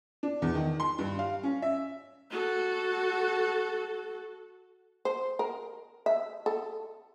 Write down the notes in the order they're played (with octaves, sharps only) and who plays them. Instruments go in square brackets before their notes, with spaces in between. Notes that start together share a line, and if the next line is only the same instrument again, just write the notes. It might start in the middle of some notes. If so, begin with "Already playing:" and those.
[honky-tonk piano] D4
E2
D#3
C6
G2
F5
C#4
E5
[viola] F#4 A4
[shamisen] C5
A#4
E5
A4